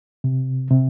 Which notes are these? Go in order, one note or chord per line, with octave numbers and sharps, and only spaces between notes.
C3
C3